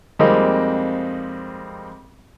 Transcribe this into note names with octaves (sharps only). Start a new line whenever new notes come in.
F2 G3 G#3 A#3 C4 D#4